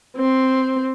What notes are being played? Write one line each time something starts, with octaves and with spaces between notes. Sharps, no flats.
C4